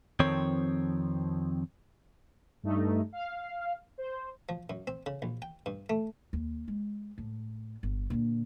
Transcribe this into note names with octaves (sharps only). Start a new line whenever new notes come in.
F2 D#3 F3 C4 C#5
G2 A3 D#4
F5
C5
F3
F#2
C4
C#3
A#1
G5
G2
A3
D#2
G#3
A2
G1
A#2 D3